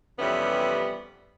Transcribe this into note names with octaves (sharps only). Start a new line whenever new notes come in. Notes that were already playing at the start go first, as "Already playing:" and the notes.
F2 C3 E3 G3 B3 C#4